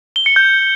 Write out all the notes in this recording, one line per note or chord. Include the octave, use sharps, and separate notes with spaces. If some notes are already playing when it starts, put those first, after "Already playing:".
G7
C#7
G6